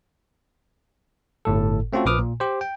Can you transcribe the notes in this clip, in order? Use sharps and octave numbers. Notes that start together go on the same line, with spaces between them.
G1 A2 A4
A3 C4 C#4 F4 F#4 A4
A#1 F3 B4 D6 D#6 F6
A#2
G4 C5
G5